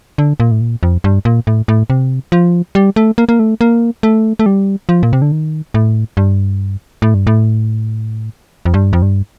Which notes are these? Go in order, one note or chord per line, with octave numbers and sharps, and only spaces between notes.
D3
A#2
A2
A#2
F2
G2
A#2
A2
A2
C3
F3
G3
A3
A#3
A#3
A3
A#3
A3
A3
G3
F3
A#2
C3
D3
D#3
A2
G2
A2
G2
A2
F2
G2
F2
G2